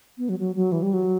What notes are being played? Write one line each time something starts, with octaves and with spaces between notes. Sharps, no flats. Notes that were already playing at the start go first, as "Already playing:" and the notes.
B3
F#3
F#3
F#3
E3
G3
F#3